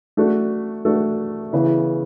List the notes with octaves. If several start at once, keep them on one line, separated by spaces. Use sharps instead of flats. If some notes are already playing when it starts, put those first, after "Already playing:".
A3 D4 F#4 A4
A3 D4 F#4 A4
C#3 E3 B3 E4